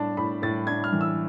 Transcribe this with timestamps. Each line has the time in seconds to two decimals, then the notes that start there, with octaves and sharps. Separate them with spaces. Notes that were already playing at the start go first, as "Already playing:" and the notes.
Already playing: A2 D4 A5
0.17 A2 B5
0.42 A2 A6
0.67 D4 G#6
0.84 F6
0.92 E3
1.01 E6